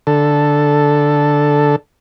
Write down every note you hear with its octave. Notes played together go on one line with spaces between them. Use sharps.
D3 A4